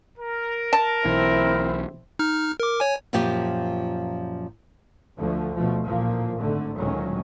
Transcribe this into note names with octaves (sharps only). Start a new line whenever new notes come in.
A#4
A5
B1 E3 C4 E4
D#4 F6
A#4 D6
C#5 G#5
F#2 A#2 F3 F4 G4
D2 D3 F3 A3
B2 F3 A3
A1 A#2 F3 A#3
G#1 G#2 D3 A3
D2 A#2 D#3 F#3 G#3 C#4